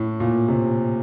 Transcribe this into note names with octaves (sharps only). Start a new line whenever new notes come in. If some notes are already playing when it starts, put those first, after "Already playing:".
Already playing: A2
A#2
C3